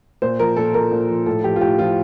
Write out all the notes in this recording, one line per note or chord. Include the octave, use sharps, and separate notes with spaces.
A#2 C5
F3 A#4
A#2 A4
F3 A#4
A#2
F3
A2 A4
F3 G4
F4
A2 G4
F3 F4